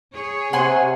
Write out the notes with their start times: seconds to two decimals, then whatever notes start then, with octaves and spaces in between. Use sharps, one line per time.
0.12 G#4 C#5
0.53 C3 F#5 G#5 C6